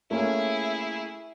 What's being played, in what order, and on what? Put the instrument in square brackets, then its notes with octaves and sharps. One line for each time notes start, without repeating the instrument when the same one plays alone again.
[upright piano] A3 A#3 C#4 [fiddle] E4 G#4